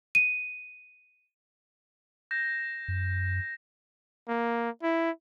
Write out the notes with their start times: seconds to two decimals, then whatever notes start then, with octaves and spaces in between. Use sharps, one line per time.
0.15 D#7
2.31 G6 A#6 E7
2.88 F#2
4.28 A#3
4.82 E4